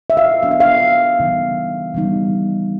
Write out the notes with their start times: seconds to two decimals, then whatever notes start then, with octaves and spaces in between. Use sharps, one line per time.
0.10 E5
0.17 F5
0.43 F#3 B3 D4 F5
0.51 E5
0.60 F5
1.19 C#3 E3 G3 B3 D#4
1.94 C#3 E3 G3 B3 D#4